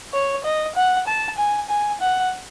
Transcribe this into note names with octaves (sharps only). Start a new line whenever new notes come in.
C#5
D#5
F#5
A5
G#5
G#5
F#5